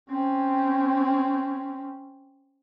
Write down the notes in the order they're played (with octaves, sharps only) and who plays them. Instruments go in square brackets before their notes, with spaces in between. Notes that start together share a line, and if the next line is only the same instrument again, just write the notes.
[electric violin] C4 C#4